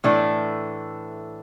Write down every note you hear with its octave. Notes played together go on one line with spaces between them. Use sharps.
A2 E3 A3 D4